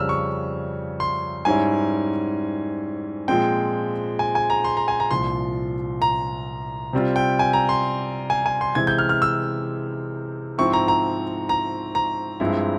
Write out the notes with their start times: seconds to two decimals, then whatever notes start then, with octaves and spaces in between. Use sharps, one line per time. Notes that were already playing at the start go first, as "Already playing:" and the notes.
Already playing: F2 C#3 G3 E6 F6
0.09 C#6
1.00 C6
1.45 G#2 G3 C#4 E4 G#5
3.28 A#2 F3 G#3 C4 G5
4.19 G#5
4.35 G#5
4.50 A#5
4.64 C6
4.77 A#5
4.88 G#5
5.00 A#5
5.11 C2 A#2 F3 C6
6.02 A#5
6.93 C3 G3 C4 F4
7.16 G5
7.39 G#5
7.53 A#5
7.69 C6
8.30 G#5
8.46 G#5
8.61 C6
8.75 C3 E3 G#3 E4 G#6
8.87 G6
8.98 F6
9.09 F6
9.22 E6
10.58 G#2 F3 C4 E4 C#6
10.73 A#5
10.88 A#5
11.49 A#5
11.95 A#5
12.40 G2 F3 G#3 C4 E4